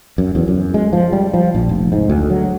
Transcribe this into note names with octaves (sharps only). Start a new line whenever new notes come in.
F#2
E2
F#2
G#3
F3
G3
F3
A#1
F1
G#2
D2
F#3